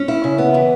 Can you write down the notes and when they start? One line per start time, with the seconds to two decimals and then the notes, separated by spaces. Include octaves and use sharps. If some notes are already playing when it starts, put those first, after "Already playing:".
Already playing: C#4
0.08 E4
0.24 C#3
0.38 B3
0.54 E3